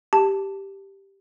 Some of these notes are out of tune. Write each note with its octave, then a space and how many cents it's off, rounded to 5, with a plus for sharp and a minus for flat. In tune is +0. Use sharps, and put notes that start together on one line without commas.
G4 +0 A5 +0